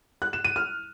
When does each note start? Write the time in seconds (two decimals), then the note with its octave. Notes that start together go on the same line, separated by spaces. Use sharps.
0.22 F#6
0.33 E7
0.45 D#7
0.56 F6